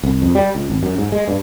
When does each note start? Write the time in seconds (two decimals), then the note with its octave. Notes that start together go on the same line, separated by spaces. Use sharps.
0.03 C2
0.22 F2
0.35 G3
0.55 C#2
0.70 G#1
0.83 F#2
0.98 G#2
1.12 G#3
1.28 G2